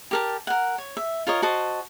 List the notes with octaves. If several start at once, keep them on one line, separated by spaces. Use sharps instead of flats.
G4 A#4 A5
A#4 F#5
C#5
E5
F4 A#4 C#5 D#5
F#4 C5 D#5 A5